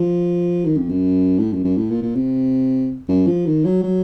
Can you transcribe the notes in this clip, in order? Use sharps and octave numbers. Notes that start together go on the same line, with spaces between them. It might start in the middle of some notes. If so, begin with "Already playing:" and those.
Already playing: F3
D#3
F2
F#2
A2
F#2
F#2
A2
A#2
A#2
C3
F#2
F3
D#3
F#3
F#3